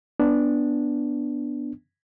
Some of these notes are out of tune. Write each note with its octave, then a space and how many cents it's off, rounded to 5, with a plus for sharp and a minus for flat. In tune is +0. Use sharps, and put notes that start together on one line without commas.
B3 -10 D4 +0